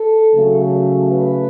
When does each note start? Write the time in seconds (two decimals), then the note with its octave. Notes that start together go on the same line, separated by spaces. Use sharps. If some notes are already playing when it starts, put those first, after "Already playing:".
Already playing: A4
0.35 C#3 F#3 A3
1.10 B4